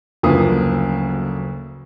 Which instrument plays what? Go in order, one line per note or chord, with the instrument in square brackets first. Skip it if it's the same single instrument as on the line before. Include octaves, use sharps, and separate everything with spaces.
[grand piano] F#1 D2 F3 A#3 B4 D#6